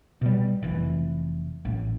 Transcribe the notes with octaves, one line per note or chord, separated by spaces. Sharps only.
B2 G3
F1 E3
A1